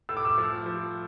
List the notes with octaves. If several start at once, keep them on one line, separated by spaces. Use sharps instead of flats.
A2 E6
D6
E6
F3
F3